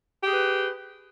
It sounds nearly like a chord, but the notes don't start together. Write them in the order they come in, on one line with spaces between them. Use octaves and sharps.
G4 G#4 B4